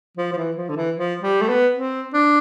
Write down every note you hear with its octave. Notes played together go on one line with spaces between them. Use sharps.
F3
F3
E3
F3
D3
E3
F3
G3
A3
B3
C4
D4